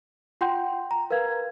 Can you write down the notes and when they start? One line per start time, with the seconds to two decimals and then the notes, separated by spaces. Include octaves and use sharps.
0.41 F4 F#5 G5 C6 G6
0.91 A#5
1.11 A#4 B4 F5 G#6